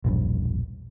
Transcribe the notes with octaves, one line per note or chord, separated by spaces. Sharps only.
E1 A#1 G2